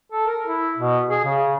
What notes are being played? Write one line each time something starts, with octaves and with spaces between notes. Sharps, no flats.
A4
A#4
E4
B2
G#4
C#3